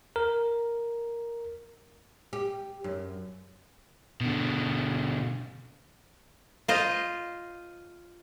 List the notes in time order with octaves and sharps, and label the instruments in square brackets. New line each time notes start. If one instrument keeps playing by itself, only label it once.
[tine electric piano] A#4
[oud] G4
F#2
[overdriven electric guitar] B2 D3
[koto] F4 C5 D#5